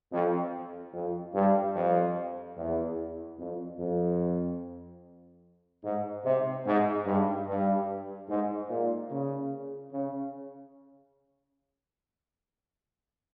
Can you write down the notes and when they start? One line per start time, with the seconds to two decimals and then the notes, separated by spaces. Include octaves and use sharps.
0.12 F2
0.93 F2
1.35 G2
1.75 F2
2.57 E2
3.39 F2
3.79 F2
5.84 G#2
6.25 C3
6.65 G#2
7.06 G2
7.47 G2
8.29 G#2
8.69 A#2
9.11 C#3
9.92 C#3